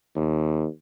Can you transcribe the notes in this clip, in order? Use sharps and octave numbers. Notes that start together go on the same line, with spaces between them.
D#2